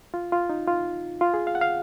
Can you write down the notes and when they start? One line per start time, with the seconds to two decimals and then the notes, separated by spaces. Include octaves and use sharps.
0.14 F4
0.32 F4
0.49 D#4
0.67 F4
1.21 F4
1.34 G#4
1.47 F5
1.55 F#5
1.61 F5